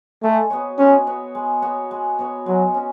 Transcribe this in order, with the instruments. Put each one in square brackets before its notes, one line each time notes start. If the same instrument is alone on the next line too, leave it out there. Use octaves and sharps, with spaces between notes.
[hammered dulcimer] G#3 [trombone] A3
[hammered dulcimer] B3 F#4 C#5
[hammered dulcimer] G#3 [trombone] C#4
[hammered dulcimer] B3 F#4 C#5
G#3
B3 F#4 C#5
G#3
B3 F#4 C#5
[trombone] F#3 [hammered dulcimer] G#3
[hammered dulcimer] C#4 F#4